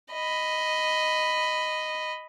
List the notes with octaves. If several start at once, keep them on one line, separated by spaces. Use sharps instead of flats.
D#5 B5